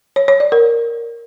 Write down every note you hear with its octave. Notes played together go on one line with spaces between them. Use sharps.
C#5
C#5
D5
A#4